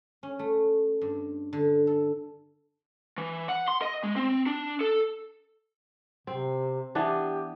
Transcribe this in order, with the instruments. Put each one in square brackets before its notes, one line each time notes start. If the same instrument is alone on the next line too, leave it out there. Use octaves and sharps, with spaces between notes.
[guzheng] C#4
A3
G2
D3
A4
[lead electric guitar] E3
F#5
C6
D#5
G#3
C4
D4
A4
[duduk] C3 [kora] C4
[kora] E3 B3 D4 [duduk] G4